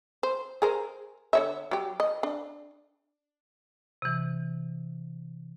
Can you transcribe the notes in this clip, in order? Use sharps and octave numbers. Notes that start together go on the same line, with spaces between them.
C5
G#4 A#4 C5
D3 C#5 E5
F#3 G4
D#5
D4
C3 E3